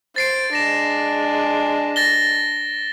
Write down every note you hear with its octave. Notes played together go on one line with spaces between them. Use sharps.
C5 A6 C7 D7
G#3 D4 A#6 E7
A6 A#6 G7